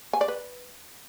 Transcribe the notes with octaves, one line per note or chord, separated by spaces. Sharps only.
G#5
D5
B4